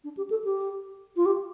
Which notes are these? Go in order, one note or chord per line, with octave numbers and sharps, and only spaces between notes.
D4
G4
A4
G4
F4
G4